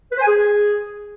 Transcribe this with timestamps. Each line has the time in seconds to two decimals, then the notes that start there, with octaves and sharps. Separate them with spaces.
0.11 B4
0.16 C5
0.21 G#5
0.26 G#4